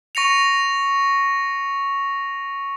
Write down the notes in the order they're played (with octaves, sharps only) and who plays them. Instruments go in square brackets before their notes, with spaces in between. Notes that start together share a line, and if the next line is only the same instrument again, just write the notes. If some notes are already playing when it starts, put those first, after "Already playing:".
[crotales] C#6 A#6 C#7 F7